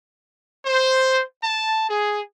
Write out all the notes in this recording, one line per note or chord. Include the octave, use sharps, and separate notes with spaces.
C5
A5
G#4